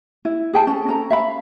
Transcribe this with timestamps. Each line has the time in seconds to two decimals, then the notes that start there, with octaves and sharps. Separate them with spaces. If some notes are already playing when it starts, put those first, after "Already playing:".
0.25 E4
0.53 G#4 G5 A5
0.67 C#4 A4
0.88 C#4 A4 A#5
1.10 E5 F5 B5